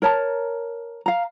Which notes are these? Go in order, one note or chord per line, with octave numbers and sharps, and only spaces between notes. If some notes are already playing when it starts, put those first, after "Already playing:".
A#4 C#5 A5 A#5
F5 A#5